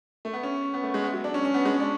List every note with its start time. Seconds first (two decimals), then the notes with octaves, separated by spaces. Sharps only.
0.25 A3
0.33 B3
0.43 C#4
0.74 B3
0.83 A3
0.94 G#3
1.04 B3
1.14 F#3
1.24 D4
1.34 C#4
1.45 C#4
1.54 B3
1.65 G#3
1.74 C#4
1.80 D4